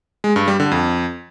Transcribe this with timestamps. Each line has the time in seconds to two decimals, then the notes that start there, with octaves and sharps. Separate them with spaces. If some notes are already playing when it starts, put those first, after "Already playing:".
0.24 G#3
0.36 G2
0.48 G3
0.60 D3
0.71 F2